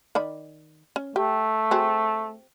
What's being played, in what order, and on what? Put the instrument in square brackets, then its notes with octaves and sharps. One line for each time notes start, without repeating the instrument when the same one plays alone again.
[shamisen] D#3 D5 B5
C#4
[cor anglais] A3 [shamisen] G4
[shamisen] C4 F#4 G#4